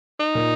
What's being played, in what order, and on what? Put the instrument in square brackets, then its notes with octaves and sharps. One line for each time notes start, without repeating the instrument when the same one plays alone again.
[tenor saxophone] D#4
[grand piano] A#2